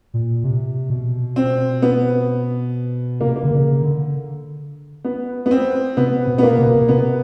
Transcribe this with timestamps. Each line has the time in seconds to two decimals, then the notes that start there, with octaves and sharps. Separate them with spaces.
0.14 A#2
0.44 C3
0.90 B2
1.36 C4
1.82 B3
3.21 C3 A#3
3.36 A#3
3.43 D3
3.51 C#3
3.82 D3
5.04 B3
5.46 B3
5.51 C4
5.97 C3 B3
6.27 B2
6.38 B3
6.43 A#3
6.59 C3
6.67 B2
6.75 C3
6.88 C3 B3